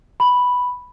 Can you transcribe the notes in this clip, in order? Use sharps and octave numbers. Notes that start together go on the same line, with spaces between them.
B5